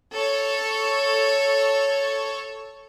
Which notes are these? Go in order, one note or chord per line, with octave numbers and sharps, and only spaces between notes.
A4 C#5